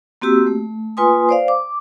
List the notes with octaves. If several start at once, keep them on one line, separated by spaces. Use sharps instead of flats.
A#3 C4 F#4 G4 E6
A3
A#3 F4 B4 G#5 C6 D#6
C5 D5 F5
D6